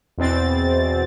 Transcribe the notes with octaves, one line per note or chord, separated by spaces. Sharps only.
E2 B2 C4 A6